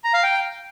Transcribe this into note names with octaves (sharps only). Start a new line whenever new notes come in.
A#5
F5
G5